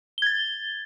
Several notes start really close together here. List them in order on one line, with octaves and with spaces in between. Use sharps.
G7 G#6 A6